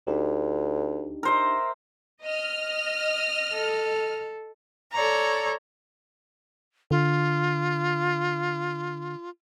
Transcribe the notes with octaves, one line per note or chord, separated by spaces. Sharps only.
D2 D4 D#4 G4
A#4 C5 E5
D#5 F6
A4
A4 C#5 D5 A#5
D3 F4